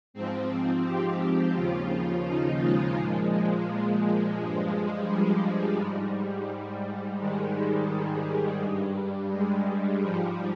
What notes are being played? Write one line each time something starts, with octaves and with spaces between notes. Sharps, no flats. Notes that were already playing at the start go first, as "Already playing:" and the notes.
G#2 F3 C4
G4
D#2 C#3 F3 F4
D#4
G#3
A#2 F3 G#3
G#3
G#3
G2 F3
G3
G#2 G3
G#2 D#3 G3 G#3
G3
G3
G2
G3
G#3
G#2 F3 G3